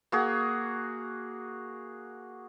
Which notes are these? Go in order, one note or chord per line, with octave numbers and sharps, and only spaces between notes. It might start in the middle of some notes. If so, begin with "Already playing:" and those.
A#3 F#4 G#4